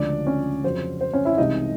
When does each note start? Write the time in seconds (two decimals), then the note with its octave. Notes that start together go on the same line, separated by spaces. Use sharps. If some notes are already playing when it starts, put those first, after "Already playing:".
Already playing: D2 C#3 F3 G#3 D4 D5
0.26 C#4 C#5
0.63 F2 C#3 F#3 C5
1.01 C5
1.13 C#4 C#5
1.25 E4 E5
1.38 C2 C3 E3 G#3 D#4 D#5